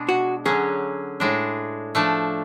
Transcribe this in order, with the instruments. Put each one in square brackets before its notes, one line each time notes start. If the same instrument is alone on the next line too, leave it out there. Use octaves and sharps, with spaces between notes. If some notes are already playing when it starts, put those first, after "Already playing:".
Already playing: [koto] B2 G#3 D4
[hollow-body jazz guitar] F#4
[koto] D3 F#3 C#4 [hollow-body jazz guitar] G#4
[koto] A2 G#3 D4
F3 A3 D4